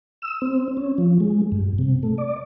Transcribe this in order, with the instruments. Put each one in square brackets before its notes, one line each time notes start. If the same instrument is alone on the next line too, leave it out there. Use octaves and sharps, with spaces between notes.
[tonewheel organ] E6
C4
C#4
F3
G#3
G2
C3
A3
D5